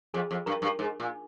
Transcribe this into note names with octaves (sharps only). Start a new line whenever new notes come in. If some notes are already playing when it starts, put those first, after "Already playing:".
F2 G#4
F2
G2 A#4
G2
G#2
A#2